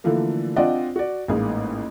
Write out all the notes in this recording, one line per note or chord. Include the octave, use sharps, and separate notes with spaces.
D3 E3 F3 A3 A#3
C4 D4 F4 D5 D#5 F#5
F#4 D5
A1 G#2 A#3 G#4